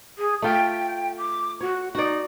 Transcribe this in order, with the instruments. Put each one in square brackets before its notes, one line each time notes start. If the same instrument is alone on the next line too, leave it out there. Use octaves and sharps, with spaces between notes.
[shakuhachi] G#4
[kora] A3 F4 [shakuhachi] G5
[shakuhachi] D6
[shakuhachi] F#4 [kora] C#5
[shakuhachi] D#4 [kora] F#4 D5